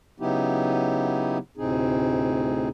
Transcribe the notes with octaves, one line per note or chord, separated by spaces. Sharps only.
C#3 F#3 B3 D#4 E4 G4
D2 A2 C3 C4 D#4 G#4